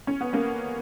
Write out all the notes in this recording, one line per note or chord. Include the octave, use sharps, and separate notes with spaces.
C#4
B3
A#3 C#4